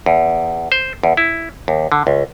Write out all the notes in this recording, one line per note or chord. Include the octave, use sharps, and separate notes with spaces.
E2
C5
E2
E4
D#2
D3
C#2